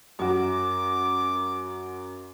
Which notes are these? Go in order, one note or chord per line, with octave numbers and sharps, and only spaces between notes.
F#2 F#4 D6